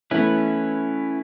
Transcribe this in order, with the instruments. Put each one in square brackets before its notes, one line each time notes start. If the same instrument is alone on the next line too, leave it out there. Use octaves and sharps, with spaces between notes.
[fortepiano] E3 A3 B3 [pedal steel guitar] C#4 E4 B4